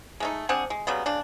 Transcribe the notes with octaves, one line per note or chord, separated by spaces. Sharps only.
G#3 A3 D#4
C4 D4 G#4 F#5
G#3
C#3 F#3 G3 B3
C#3 D4